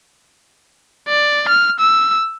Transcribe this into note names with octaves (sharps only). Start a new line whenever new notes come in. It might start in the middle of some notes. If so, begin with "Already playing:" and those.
D5
F6
E6